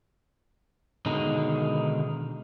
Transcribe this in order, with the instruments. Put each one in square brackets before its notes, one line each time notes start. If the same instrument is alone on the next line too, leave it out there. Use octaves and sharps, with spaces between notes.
[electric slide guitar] B2 D3 D#3 G#3 D#4